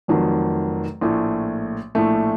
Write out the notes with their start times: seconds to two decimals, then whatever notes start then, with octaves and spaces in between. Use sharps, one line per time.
0.08 F1 F2 D#3 F#3
1.01 A#1 A2 A3
1.95 A#1 A2 A3